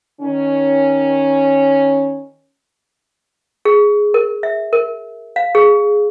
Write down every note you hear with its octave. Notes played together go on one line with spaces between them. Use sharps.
D#3 C#4
G#4
A#4
E5
A#4
F5
G#4